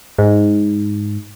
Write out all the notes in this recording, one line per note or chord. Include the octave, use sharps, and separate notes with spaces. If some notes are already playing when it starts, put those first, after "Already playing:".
G#2